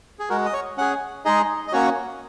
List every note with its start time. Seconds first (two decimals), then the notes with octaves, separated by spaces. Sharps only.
0.19 G#4
0.30 G#3 F#4 A#4
0.46 D#5
0.53 C#5
0.77 C#4 G#4 F#5
1.25 G#3 D#4 G#4 D#5
1.68 D#5
1.72 A#3 C#4 F#4 C#5